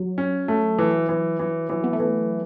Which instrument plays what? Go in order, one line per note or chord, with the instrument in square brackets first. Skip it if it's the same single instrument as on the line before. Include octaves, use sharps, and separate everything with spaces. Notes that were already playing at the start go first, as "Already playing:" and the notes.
Already playing: [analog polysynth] F#3
[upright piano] C#4
A3
E3
E3
E3
[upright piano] E3 [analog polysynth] F#3
[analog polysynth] B3
A3
[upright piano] E3